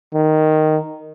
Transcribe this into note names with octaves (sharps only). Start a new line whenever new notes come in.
D#3